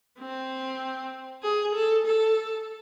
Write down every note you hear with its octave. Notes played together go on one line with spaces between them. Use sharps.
C4
G#4
A4
A4